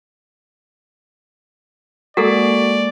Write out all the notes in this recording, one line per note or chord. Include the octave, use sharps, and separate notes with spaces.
G#3 A#3 F#4 A4 A#4 D5 F#5